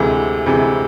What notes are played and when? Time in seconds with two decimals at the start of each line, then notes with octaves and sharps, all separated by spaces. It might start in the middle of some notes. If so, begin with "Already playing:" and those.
Already playing: D2 C3 E3 G#3
0.46 D2 C3 E3 G#3